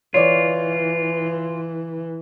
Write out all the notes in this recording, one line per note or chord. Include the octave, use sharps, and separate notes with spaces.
E3 F4 C#5 D5